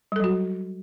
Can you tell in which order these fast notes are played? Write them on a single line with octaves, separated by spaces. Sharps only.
G3 A4 F#3 F#4